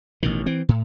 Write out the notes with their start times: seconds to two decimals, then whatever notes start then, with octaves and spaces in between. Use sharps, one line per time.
0.23 A1 B2 D#3
0.46 E3 C4
0.69 A2